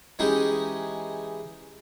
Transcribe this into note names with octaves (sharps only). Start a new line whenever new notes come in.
E3 G#3 C#4 D#4 G4